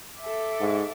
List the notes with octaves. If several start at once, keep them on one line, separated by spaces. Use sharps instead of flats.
A4 E5 D6
G#2